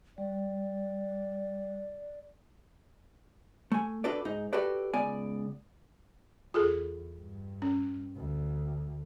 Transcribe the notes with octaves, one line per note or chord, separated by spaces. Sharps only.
G3 D5
A3 G#5
D4 F#4 A4 B4 D5
G#2 D#4
F#4 G4 A4 B4 D5
C#2 B3 D5 G#5
E2 F4 G#4 A4
G2
C#4
D2